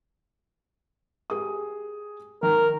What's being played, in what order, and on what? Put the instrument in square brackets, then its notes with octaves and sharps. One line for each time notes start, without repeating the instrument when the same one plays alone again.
[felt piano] G4 G#4 D#6
[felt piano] D#3 [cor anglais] A#4